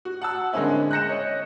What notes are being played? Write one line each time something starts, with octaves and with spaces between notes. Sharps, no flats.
F#4
F#5 A5 E6
D3 G#3 A#3 C4 C#4 E4
F#6 G6 A#6 C#7 E7
C#5 D#5